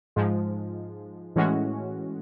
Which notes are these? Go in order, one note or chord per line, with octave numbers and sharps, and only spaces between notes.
G#2 F3 G#3
A2 E3 G#3 C#4 F#4